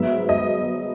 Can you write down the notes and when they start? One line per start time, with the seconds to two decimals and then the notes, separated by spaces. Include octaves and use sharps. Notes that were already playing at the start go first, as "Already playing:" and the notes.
Already playing: G#2 F#3 B3 E5
0.29 D#5